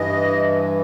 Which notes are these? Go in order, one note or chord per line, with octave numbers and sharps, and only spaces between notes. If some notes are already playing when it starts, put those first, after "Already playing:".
Already playing: G2 E3 D#5